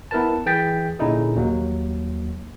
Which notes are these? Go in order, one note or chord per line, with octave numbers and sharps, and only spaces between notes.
B3 E4 A#4 B4 A5
E3 G#4 G5 A6 B6
A#2 D3 C#4 D#4 E4 G#4
D#2 F#3 A#3